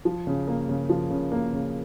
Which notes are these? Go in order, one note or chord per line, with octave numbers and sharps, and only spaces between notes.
F3
C#3
A#3
C#3
F3
C#3
A#3
C#3